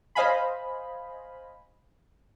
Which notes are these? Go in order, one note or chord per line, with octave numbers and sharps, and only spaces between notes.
C5 D#5 F5 G#5 B5